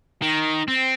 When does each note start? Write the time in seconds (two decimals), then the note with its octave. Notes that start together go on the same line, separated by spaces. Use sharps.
0.22 D#3
0.68 C4